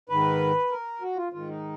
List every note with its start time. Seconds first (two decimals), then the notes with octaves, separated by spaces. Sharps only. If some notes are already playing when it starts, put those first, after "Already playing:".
0.09 G#2 D#3 B4
0.71 A#4
1.01 F#4
1.17 F4
1.32 G#2 D#3 F4
1.48 D#4